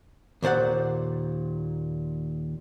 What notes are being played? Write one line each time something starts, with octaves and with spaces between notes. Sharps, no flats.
D#2 A#2 C5 D5 F#5